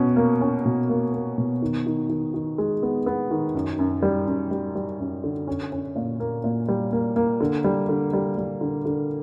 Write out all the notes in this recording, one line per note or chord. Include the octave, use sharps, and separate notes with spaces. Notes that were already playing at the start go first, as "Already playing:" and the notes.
Already playing: B2 C#4
A#3
C#4
B2
A#3
A#3
B2
D#3
D#3
D#3
D#3
G#3
B3
B3
D#3
F#2
F#2
G3
F#2
G3
G3
F#2
D3
C#4
C#4
A#2
A#3
A#2
G3
A#3
A#3
D3
G3
D3
G3
G3
D3
D3